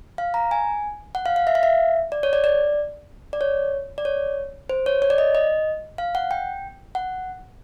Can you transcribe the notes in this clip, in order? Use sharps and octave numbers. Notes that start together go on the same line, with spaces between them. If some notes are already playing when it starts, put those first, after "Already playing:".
F5
A#5
G#5
F#5
F5
F5
E5
F5
E5
D5
C#5
D5
D5
D5
C#5
D5
C#5
C5
C#5
C#5
D5
D#5
D#5
F5
F#5
G5
F#5